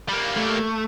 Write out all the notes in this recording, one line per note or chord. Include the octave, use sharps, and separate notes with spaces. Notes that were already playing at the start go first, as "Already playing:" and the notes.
G3 A#3
A3